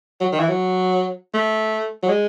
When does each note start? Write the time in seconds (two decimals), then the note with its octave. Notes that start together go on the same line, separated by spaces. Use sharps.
0.20 F#3
0.32 D#3
0.40 E3
0.49 F#3
1.34 A3
2.03 F#3
2.09 G#3